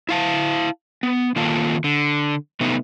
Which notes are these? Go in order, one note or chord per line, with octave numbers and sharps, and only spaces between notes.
E4 F5 A5
B3
D#3 A#3 F4 A4 F5 A5
D3
C3 A3 B3 D#4